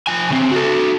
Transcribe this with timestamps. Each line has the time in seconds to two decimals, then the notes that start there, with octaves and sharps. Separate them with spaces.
0.07 F3 G#5
0.30 C#3 C4
0.51 F#4 A4